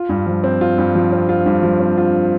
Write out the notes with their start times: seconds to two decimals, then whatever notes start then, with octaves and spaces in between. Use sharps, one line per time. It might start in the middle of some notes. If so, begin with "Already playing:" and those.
Already playing: F4
0.09 G2
0.27 F3
0.44 C4
0.61 F4
0.78 G2
0.95 F3
1.12 C4
1.29 F4
1.46 G2
1.63 F3
1.80 C4
1.98 F4